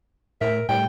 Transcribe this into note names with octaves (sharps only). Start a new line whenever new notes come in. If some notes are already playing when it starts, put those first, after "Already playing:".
A2 A#4 E5
A2 G3 G5